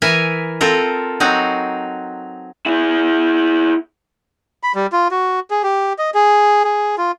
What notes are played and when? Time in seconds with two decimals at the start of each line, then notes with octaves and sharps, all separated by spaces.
0.02 E3 A#4 E5 G#5
0.61 C4 F4 A4 A#4
1.20 F#3 C4 D#4 F#4
2.66 E4 G#4
4.63 B5
4.75 G3
4.92 F4
5.11 F#4
5.50 G#4
5.63 G4
5.98 D#5
6.14 G#4
6.64 G#4
6.98 F4